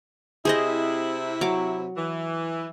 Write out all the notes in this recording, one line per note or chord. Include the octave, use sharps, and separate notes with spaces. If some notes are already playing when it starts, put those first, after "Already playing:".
C3 E4 G#4 C5 D#5
F#3 D6
E3